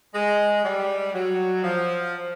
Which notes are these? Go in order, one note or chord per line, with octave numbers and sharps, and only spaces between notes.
G#3
G3
F#3
F3